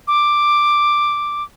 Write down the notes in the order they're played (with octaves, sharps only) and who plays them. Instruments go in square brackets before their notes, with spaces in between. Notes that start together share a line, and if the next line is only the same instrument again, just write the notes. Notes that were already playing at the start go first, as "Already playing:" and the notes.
[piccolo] D6